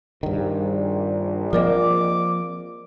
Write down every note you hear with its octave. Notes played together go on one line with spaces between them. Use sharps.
A#1 G2 D#3
F3 A#3 C4 A#4 D5 D#5 D6